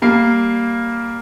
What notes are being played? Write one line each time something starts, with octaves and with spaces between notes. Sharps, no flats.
G3 A#3 C7